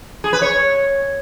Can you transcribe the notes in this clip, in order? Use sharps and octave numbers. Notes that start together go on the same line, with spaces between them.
G#4
B4
C#5